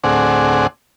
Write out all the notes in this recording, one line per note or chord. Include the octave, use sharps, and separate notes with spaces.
D2 A2 C4 G#4 D5 F#5